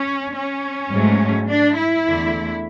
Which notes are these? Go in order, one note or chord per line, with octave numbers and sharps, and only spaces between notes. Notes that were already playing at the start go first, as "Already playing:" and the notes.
Already playing: C#4
C#4
G#2 F#3 A3
D4
E4
E2 D3 A3